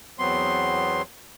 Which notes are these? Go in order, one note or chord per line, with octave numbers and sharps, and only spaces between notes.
E2 F#3 B3 C4 C6